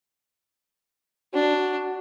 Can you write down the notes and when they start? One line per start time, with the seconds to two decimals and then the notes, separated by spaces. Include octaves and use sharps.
1.34 D4 F#4